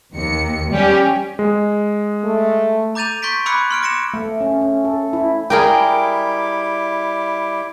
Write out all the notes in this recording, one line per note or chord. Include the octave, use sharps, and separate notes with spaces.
D#2 C#7
G3 C#4 G4
G#3
A3
A#5 D6 G6 A6 D#7 F7
C6 C#6 G6 A6 B6 D7
B5 D6 E6 F#6 G#6 C#7
C6 F6 D7
D6 A#6 C#7 E7
A3
C#4
C#4
A4
E4
G3 E4 G#4 A#4 G5 D6